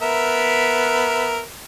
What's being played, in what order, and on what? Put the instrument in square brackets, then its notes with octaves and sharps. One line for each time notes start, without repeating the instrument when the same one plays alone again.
[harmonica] B3 A#4 E5